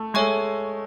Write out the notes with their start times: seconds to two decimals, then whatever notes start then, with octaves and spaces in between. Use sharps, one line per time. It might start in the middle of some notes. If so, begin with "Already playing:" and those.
Already playing: A3
0.14 G#3 A4 C#5 E5 G#5 C#6